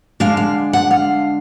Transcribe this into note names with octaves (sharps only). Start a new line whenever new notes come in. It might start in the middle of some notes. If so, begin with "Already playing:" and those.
D3 G#3 D4 F5
F5
F#5
F5